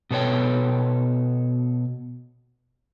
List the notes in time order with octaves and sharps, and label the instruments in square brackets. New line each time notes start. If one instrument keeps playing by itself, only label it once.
[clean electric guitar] B2 B3 A4 C#5 G5